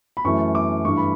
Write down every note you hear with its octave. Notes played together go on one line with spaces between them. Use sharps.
B5
F#2 E3 A3 C#6
D6
G2 E3 A3 C#6
B5